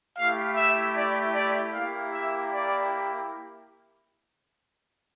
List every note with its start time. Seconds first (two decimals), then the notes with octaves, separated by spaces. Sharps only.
0.17 A3 E4 G4 F5
0.57 E5
0.97 D5
1.35 D5
1.75 A#3 E4 G4 F5
2.13 E5
2.53 D5